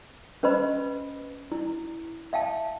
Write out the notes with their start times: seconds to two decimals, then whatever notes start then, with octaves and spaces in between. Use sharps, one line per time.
0.43 C#4 B4 C5 D#5 B5
1.52 E4
2.33 E5 F5 G5 A5